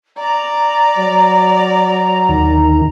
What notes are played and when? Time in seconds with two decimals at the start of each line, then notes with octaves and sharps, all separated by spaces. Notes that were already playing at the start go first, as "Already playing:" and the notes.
0.18 D5 A#5
0.98 F#3
2.29 D#2 D#3